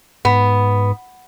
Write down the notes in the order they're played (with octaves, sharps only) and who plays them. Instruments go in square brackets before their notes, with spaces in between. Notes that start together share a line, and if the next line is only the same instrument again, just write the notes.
[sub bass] G#2 [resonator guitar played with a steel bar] B3